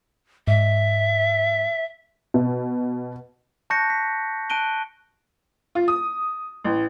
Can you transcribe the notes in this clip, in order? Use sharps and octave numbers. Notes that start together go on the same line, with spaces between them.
G#2 E5
B2
A5 C#6 F#6 G6 A#6 C#7
B6
A5 F#6 D7 D#7 G7
F4
D#6
A1